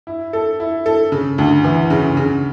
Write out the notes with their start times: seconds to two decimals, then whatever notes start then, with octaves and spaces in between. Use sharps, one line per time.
0.07 E4
0.33 A4
0.60 E4
0.86 A4
1.12 C#3
1.38 D2
1.64 E3
1.90 C#3
2.17 C#3